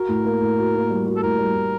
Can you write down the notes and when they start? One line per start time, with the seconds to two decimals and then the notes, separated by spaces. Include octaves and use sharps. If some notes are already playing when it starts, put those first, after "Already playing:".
Already playing: F#4 A#4
0.09 A2
0.25 A#3
0.41 A2
0.58 F#4
0.75 A#3
0.90 G3
1.06 F#4
1.16 A4
1.23 A2 A#4
1.39 G3
1.55 A2